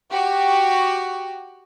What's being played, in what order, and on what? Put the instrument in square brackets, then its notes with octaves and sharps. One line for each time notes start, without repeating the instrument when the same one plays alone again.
[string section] F#4 G4